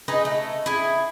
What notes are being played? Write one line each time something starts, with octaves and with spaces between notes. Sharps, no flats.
D#4 G#4 B4 D#5
A3
E4 G#4